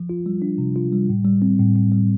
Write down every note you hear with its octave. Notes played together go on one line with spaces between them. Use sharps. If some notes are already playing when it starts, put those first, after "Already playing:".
Already playing: F3
F4
G3
D4
C3
F4
G3
A2
G3
C4
A2
A2
G3